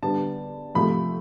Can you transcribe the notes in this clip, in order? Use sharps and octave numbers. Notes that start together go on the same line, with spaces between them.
D3 G3 B3 A5
C3 F3 A3 B5